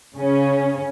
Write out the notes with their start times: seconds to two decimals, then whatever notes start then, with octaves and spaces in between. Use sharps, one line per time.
0.16 C#3 C#4